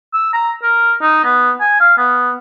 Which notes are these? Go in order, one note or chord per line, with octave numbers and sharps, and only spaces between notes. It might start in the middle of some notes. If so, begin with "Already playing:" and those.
E6
A#5
A#4
D#4
B3
G#5
F5
B3